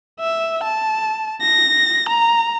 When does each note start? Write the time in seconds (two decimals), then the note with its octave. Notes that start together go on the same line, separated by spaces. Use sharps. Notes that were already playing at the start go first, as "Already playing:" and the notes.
0.20 E5
0.64 A5
1.41 A#6
2.09 A#5